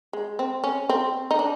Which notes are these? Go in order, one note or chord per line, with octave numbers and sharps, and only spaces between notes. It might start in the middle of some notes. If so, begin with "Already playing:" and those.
G#3
C4
C#4
C4
D#4
D4